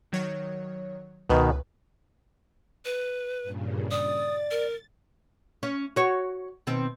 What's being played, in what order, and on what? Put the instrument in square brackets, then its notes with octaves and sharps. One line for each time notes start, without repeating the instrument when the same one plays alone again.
[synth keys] D#3 F#3 C#5
[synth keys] C#2 B4 [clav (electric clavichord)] B2 D#3
[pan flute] B4
[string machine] G2 A#2 C#3
[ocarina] D5 [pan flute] D#6 [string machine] A6
[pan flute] A#4
[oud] C#4
F#4 C#5
B2 D#3 C4